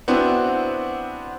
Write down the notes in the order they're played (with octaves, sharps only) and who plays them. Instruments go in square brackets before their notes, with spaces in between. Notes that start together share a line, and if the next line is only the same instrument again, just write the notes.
[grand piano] B3 C4 D4 E4 F#4